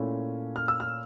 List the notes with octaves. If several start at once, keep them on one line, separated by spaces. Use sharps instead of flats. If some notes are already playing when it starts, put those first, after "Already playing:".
Already playing: A#2 A3 C#4 E4
F6
E6
F6